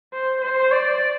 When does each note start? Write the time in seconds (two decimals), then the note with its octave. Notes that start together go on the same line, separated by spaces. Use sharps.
0.14 C5
0.42 C5
0.72 D5